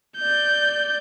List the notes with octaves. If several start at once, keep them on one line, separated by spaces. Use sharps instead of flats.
D5 G6